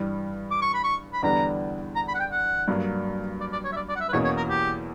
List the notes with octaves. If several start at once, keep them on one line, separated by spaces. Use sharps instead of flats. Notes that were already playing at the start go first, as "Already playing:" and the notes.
Already playing: G2 E3 G3
D6
C#6
B5
C#6
B5
E2 D3 G3 B3 D4 A#5
A#5
B5
F#5
G5
F#5
G2 F#3 A#3 D4
D5
D5
C#5
E5
D5
D5
F#5
E5
B4
E2 B2 A#3 C#4 C#5
C#5
A#4
G4